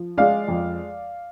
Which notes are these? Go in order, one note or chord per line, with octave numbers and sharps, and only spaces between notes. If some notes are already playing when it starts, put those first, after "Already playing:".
Already playing: F3
G#3 D5 F5
F2